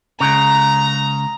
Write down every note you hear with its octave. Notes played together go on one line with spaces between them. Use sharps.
C#2 C#3 A#5